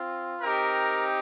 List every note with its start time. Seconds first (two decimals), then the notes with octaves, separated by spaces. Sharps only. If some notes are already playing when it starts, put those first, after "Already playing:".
Already playing: C4 F4
0.40 C4 D#4 G4 A#4